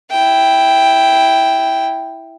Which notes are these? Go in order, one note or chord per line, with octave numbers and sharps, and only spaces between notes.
E4 G5